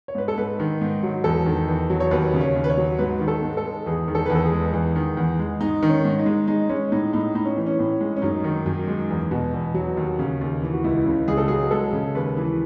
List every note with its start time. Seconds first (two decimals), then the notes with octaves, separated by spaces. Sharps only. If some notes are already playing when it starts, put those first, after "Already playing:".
0.08 C#5
0.15 G#2 B4
0.28 A4
0.38 G#2 B4
0.60 D#3
0.81 G#2
1.03 F#3
1.24 E2 A4
1.46 D#3
1.68 E2
1.90 F#3
2.00 C#5
2.11 D#2 B4
2.34 C#3
2.41 C#5
2.55 D#2
2.64 B4
2.70 C#5
2.78 F#3
2.99 G#2 B4
3.20 D#3
3.28 A4
3.42 G#2
3.57 A4
3.65 G#3
3.86 E2 G#4
4.08 D#3
4.15 A4
4.26 E2 B4
4.35 A4
4.45 G#4
4.52 G#3
4.73 E2
4.96 D#3
5.17 E2
5.39 G#3
5.61 G#2 D#4
5.83 D#3
5.90 C#4
6.05 G#2
6.19 D#4
6.26 G#3
6.47 G#3 D#4
6.69 G#3 C#4
6.92 A2 D#4
7.13 A2 D#4
7.35 A2 D#4
7.45 C#4
7.57 E3
7.66 C#4
7.79 A2
8.01 G#3
8.17 C#4
8.22 F#2 D#4
8.44 D#3
8.66 F#2
8.87 G#3
9.09 E2
9.31 B2
9.54 E2
9.74 F#3
9.97 D#2
10.19 C#3
10.41 D#2
10.62 E3
10.73 F#4
10.84 C#2 E4
11.05 C#3
11.28 C#2 G#4
11.37 A4
11.48 F#3 G#4
11.71 G#3 A4
11.93 C#3
12.15 D#2 B4
12.37 E3